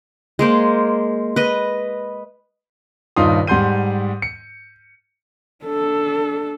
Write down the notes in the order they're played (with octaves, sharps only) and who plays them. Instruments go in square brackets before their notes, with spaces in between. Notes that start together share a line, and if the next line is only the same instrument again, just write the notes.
[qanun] G#3 A#3 C5
B4 D#5
[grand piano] D#1 G2 D#4 F4 C6 D#6
G#2 G3 F#5 C6 G6 D#7
C#7
[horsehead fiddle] D4 A4